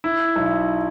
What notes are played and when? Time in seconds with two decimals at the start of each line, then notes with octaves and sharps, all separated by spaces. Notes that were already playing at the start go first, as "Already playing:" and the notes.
0.04 E4
0.36 B1